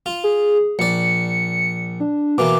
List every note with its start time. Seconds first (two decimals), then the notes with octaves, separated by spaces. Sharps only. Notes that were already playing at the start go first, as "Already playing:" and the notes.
0.06 F4
0.24 G#4
0.79 A#1 D5 C#7
2.00 D4
2.38 B2 E3 A#3 D6